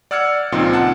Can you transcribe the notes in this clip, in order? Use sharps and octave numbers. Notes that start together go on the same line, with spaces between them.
D5 F#5 E6 F6 G#6 C#7
C#2 A#2 F3 C4 D#4 C6
F#5 A5